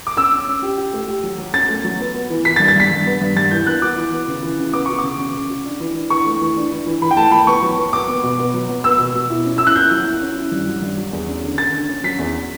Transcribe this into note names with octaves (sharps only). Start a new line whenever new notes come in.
D6
C#4 E6
C#4
C#4
G4
G4
A3
G4
F#3
F#3
C#4 A6
A3
F#3
B3
B3
E3
E3 B6
A6
G2
A6
G2 B6
G2
B3
G2
G2 A6
E3 G6
B3 F#6
F#4 D6
E3
B3
C#3
E3
C#3
B3 D6
F#4 C#6
C#3 D6
C#3
C#3
F#4
D4
E3
D4
E3 C#6
A3
E3
D4
E3
E3
E3 B5
G5
A3 A5
E3 B5
B3 C#6
F#3
B3
B3 D6
B3
B2
B3
F#3
B3
B3 E6
B2
B2
E4
C#4
E4 E6
F#6
E4 G6
F#3
E4
C#4
E4
G2
F#3
G2
F#3
E2
C#4
D3
D3 A6
D3
C#4
F#3 B6
E2